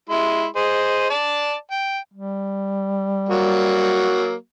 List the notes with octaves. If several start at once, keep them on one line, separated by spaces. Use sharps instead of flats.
G#3 E4 C6
G#4 C5 D#5
D5 A5
G5
G3
F#3 A#3 F#4